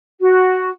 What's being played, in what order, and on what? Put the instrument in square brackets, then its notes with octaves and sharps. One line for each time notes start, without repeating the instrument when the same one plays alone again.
[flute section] F#4